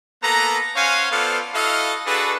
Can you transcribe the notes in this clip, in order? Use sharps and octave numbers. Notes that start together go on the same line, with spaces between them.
A#3 B3 A4 B4 A#5
C#4 C5 C#5 F5 F#5 G#5
B3 F4 A4 C5 D5 F5
E4 F#4 A4 D#5 F5
D4 F#4 G#4 A4 B4